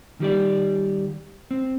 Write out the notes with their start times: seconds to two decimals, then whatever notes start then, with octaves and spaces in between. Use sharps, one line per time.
0.20 D#3 G3 G4 D5
1.51 C4